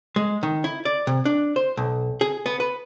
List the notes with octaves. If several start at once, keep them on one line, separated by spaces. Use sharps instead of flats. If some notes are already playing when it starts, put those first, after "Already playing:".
G#3
D#3
E4
D5
C3
D4
C5
B1
G#4
B3
B4